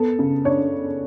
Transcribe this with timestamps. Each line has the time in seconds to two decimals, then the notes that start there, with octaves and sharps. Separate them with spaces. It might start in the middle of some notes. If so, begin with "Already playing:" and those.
Already playing: B3 A4
0.19 C#3
0.45 D4 C#5